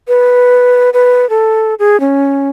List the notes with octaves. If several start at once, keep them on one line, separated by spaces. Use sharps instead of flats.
B4
B4
A4
G#4
C#4